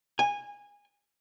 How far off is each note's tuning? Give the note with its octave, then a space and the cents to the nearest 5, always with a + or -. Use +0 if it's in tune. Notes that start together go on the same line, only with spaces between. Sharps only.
G#5 -20